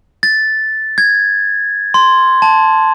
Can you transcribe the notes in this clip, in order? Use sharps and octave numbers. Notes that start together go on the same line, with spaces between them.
A6
G#6
C6
A5